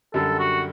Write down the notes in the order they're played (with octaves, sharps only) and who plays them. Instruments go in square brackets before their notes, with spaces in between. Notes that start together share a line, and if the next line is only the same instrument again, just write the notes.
[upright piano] F#2 D3 G3 [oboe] A4
[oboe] F#4